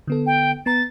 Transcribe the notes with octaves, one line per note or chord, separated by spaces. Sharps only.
D3 B3 A4
G5
B3 A#5 A6